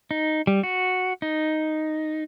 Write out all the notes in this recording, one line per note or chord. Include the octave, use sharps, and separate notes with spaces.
D#4
G3
F#4
D#4